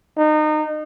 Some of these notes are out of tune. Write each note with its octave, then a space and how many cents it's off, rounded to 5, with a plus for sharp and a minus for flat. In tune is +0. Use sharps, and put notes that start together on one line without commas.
D#4 -25